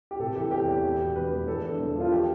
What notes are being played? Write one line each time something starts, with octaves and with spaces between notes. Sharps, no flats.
G4
C3 A4
E3 G4
E2 G4
E2
E2
B2
E1 B4
E1
E2 A4
D3
E1
F3 F4
G4